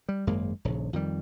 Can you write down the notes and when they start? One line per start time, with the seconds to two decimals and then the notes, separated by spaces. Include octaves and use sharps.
0.09 G3
0.27 G#1 F#2 G#3 A#3
0.65 D#1 A#1 C#3
0.93 F2 D#3 G3